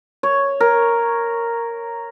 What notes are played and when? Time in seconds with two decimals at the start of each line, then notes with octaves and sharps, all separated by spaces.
0.23 C#5
0.60 A#4